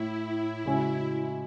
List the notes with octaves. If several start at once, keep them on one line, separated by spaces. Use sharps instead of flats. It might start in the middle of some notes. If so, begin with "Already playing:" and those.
Already playing: A2 E4
C#3 G#3 C#4 F#4